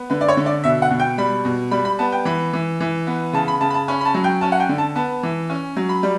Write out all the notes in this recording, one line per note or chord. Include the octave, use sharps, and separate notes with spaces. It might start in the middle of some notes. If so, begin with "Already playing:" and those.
Already playing: B3
D3 B4
D5
C#5
D3
D5
B2 E5
F#5
B2
G5
G3 B5
B2
G3 B5
B5
B3 A5
G5
E3 B5
E3
E3
B3
C#3 A5
B5
C#3 A5
B5
A5
C#4 B5
B5
A5
F#3
G5
C#4 A5
F#5
G5
D3
A5
B3 A5
E3
C#4
F#3
B5
G3